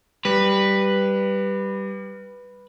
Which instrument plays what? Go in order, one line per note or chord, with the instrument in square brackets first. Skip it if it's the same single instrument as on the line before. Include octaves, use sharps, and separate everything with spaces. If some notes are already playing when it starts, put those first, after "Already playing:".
[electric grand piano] G3 [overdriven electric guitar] B4